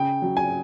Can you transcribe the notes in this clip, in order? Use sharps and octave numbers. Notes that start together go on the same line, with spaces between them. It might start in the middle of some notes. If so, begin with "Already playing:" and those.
Already playing: C#3 G5
F#3
G#5